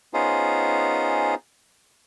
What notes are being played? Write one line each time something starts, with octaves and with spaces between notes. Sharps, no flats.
B3 C#4 D#4 F4 G#4 C5